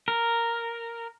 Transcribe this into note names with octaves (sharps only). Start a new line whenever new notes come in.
A#4